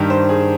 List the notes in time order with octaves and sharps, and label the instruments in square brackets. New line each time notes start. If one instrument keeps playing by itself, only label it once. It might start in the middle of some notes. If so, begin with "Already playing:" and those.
Already playing: [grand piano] G2 D#3 G3
C5
G#4